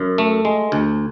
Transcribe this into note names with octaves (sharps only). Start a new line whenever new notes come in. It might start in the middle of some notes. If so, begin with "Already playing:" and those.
Already playing: F#2
A3
G#3
D2